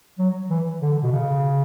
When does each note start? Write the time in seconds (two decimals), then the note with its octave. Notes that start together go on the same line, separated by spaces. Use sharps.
0.19 F#3
0.50 E3
0.82 D3
1.03 B2
1.12 C#3